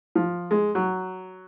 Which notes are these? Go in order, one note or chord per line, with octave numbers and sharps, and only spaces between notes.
F3
G#3
F#3